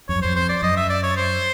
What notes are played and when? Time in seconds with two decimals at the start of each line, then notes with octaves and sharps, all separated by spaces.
0.09 F2 C#5
0.16 F#2
0.22 F2 C5
0.36 C5
0.49 D5
0.62 F#2 D#5
0.77 E5
0.90 D5
1.03 C#5
1.17 C5